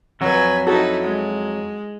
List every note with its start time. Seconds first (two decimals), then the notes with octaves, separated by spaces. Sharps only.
0.21 F2 F#3 B4 G#5
0.67 D#4 E4 F#4 A4
1.03 G#3